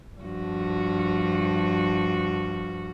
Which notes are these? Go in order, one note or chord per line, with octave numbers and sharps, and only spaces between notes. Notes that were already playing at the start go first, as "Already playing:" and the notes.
G2 F3 F#4